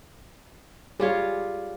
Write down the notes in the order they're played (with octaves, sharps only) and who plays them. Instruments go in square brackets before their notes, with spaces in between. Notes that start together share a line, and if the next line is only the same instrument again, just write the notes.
[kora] G3 F4 C#5 [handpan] G#4